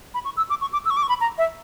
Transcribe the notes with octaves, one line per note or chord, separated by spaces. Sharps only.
B5
C#6
E6
D6
C#6
D6
E6
C#6
D6
C#6
B5
A#5
E5